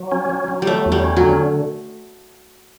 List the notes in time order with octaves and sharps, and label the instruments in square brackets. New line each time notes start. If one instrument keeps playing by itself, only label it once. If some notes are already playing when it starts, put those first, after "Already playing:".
Already playing: [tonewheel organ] F#3
C#4
F#3
F#3
[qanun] G3
[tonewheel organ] F#3 [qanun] A3
[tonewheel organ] E2
[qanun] G3
[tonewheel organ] C#4
[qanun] F#3
[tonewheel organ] D3